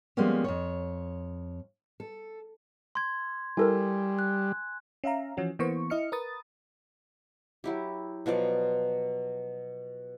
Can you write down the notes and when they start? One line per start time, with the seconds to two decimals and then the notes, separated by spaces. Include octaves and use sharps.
0.17 F3 G3 G#3 A#3 B3 C#4
0.44 F2 C#5
2.00 A4
2.95 C6 G#6
3.57 G3 E4 A4 A#4 G#5
4.19 F#6
5.04 C#4 E5 F5 A#5
5.37 E3 F3 C#4 F#4
5.59 E3 A#3 B3 C5 C#6
5.90 E4 D#5 F6 C#7
6.12 A#4 B4 D#6 A6
7.64 F#3 E4 G4
8.26 B2 F3 F#3 D5